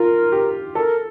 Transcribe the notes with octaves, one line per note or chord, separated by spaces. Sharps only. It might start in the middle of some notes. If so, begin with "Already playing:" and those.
Already playing: F4 A#4
G4
A4 A#4